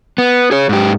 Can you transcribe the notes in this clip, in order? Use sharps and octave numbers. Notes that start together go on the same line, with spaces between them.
B3
G#4 C#5
G#2 G4